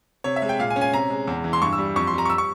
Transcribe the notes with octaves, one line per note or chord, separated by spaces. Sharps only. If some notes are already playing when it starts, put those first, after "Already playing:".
C3 C#5
E5
G#3
G5
A#2 F5
G#5
C#4
G#5
C3 A#5
G#3
E2
E3
C6
G2 C#6
E6
G3
F2 C#6
C6
G3 A#5
C#6
E6
C#6